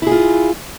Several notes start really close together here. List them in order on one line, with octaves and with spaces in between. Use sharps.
E4 G#4 F4